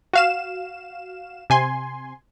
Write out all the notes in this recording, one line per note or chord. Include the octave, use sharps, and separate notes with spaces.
F#4 F5 E7
C3 G#5 C6